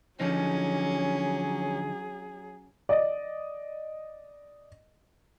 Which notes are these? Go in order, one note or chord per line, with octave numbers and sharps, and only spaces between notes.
D3 F3 F#3 C#4 D#4 G#4
D5 D#5